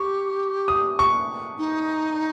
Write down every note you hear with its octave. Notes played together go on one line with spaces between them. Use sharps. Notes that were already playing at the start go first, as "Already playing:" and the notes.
Already playing: G4 C#6
D#6
C#6
D#4